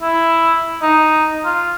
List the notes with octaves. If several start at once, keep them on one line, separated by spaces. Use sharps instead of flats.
E4
D#4
F4